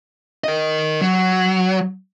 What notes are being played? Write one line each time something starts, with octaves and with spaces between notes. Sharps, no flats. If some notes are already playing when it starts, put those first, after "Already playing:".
A#4 D#5
F#3